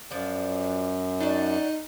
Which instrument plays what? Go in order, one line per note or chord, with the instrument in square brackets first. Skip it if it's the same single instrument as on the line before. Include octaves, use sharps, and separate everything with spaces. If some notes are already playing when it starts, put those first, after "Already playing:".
[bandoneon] F#2 [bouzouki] F3 D4
[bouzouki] D4 F#4 [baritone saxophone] D#4